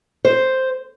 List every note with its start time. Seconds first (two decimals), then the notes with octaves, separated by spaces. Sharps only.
0.25 C5